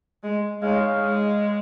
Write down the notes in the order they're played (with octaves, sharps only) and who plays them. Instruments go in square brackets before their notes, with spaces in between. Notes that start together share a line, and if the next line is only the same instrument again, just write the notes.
[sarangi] G#3
[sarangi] G#3 [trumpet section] D#4 G#4 C#5 F5
[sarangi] G#3